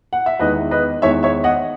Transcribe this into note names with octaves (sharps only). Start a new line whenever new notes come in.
F#5
E5
E2 D#3 G#3 B3 B4 D#5
B4 D#5
E2 D#3 G#3 B3 C#5 E5
C#5 E5
D#5 F#5